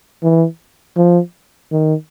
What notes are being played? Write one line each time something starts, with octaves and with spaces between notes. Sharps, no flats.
E3
F3
D#3